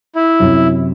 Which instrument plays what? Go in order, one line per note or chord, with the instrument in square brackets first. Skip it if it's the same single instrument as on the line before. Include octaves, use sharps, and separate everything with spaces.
[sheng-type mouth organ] E4
[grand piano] F#2 C3